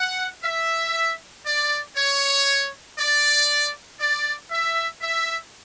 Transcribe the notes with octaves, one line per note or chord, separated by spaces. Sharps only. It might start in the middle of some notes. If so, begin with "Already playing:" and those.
Already playing: F#5
E5
D5
C#5
D5
D5
E5
E5